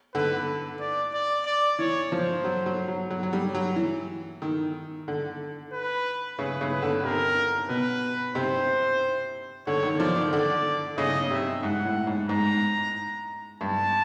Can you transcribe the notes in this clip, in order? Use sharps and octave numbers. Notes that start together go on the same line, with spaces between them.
D3 B4
D5
D5
D5
E3 C#5
F3 C5
F#3
F#3
F#3
F#3
F#3
G3
F#3
E3
D#3
D3
B4
C#3 B4
C#3
B4
D3
C3 A#4
B2 B4
C3 C5
D3 C#5
D#3
F3 D5
D#3
D3 D5
C#3 D#5
C3 E5
G#2 F#5
A2
G#2
G#2 A#5
G2 A5